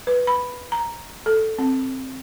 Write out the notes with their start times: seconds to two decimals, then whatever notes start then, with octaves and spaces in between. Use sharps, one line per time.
0.07 B4
0.27 B5
0.72 A#5
1.26 A4
1.58 C4